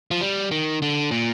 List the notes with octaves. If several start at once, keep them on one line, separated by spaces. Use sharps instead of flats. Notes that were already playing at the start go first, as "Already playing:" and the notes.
F3
G3
D#3
D3
A#2